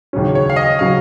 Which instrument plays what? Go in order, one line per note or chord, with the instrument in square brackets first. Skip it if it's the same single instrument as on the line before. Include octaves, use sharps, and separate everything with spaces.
[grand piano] D#2 C#3 F#3 C#4
[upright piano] C#5
F5
D#5
[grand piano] C#3 F#3 C#4 [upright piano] F5